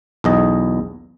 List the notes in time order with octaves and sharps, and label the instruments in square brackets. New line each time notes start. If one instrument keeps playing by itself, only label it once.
[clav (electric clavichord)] B1 E2 D#5